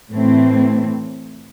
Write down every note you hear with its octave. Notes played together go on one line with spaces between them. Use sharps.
A2 E3 A3 C4